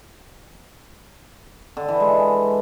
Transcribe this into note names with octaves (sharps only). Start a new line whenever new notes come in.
D3
E3
G#3